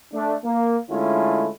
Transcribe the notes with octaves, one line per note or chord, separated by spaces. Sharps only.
A3 D4
A#3
D3 G#3 A3 C#4 E4 F4